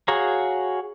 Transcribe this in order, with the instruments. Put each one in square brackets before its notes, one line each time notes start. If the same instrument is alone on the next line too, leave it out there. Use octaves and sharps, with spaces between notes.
[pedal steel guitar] F#4 G#4 C#5 F5 A#5